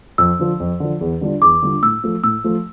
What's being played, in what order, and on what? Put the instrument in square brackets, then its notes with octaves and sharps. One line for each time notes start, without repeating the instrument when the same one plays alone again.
[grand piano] F2 [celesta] E6
[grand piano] D3 F3
F2
D3 F3
E2
D3 G3 D4 F4
[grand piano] E2 [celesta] D6
[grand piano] D3 G3 D4 F4
[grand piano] A2 [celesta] E6
[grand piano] F3 A3
[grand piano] A2 [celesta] E6
[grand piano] F3 A3